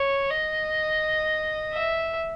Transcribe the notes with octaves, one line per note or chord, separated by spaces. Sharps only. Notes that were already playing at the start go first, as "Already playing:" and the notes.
Already playing: C#5
D#5
E5